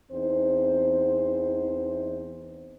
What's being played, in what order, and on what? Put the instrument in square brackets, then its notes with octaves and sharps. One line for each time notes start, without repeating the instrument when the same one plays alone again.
[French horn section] E2 C4 D#4 C5